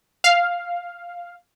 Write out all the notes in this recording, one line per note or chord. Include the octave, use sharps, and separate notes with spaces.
F5